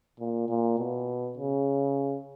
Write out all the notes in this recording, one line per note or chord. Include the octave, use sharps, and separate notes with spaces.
A#2
A#2
B2
C#3